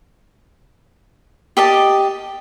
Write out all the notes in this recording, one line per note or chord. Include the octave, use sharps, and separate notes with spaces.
G4 D#5 A5